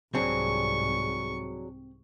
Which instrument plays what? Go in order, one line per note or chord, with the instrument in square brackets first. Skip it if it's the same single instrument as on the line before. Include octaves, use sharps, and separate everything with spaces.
[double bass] C2 G#2 [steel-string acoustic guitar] F#3 D4 G#4 [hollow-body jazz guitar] C4 [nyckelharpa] C#6